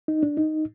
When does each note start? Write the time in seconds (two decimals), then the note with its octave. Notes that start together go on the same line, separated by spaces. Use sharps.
0.08 D#4
0.23 D4
0.37 D#4